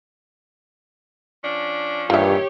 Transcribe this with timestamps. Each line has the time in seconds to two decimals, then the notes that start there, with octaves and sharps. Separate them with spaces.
1.42 F3 C#4 D4
2.10 G2 A#2 D#3 E3 F4 G4 C#5 E5